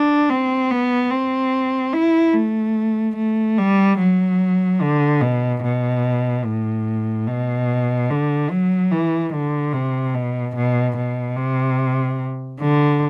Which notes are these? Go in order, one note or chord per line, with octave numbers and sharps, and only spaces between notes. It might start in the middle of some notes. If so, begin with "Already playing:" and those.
Already playing: D4
C4
B3
C4
E4
A3
A3
G3
F#3
D3
B2
B2
A2
B2
D3
F#3
E3
D3
C3
B2
B2
B2
C3
D3